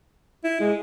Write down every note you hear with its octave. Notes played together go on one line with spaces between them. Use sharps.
E4
G#3